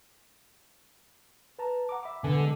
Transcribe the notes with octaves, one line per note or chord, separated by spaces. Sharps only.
B4 A5 A#5
F#5 A#5 D6
E5 B5 D6
D3 B3 A4 G#5
G3 G#3 A4